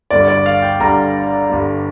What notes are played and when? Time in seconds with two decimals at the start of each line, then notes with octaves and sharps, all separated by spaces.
0.11 G1 G2 D3 G3 D5
0.28 D5
0.46 F5
0.62 G5
0.80 G1 G2 D3 G3 A#5
1.49 G1 G2 D3 G3